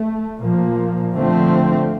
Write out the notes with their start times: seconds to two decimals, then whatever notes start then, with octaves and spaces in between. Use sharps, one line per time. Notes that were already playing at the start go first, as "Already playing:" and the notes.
Already playing: A3
0.40 A#2 F3 A#3
1.15 D3 F3 A3 C4